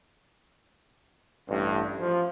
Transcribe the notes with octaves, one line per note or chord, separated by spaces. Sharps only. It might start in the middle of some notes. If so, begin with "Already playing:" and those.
A1 G2
F3